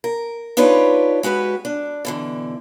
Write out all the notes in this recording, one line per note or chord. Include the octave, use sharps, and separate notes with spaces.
A#4
D4 D#4 F4 G4 B4 C#5
G#3 F#4 G4 B4
D4
B2 D3 E3